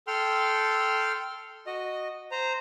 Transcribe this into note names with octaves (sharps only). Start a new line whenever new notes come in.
A4 G5 C6 F6
F#4 D#5
C5 A#5